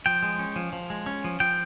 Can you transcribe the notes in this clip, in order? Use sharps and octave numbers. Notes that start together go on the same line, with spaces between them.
F3 G5
G#3
C#4
F3
F3
G#3
C#4
F3
F3 G5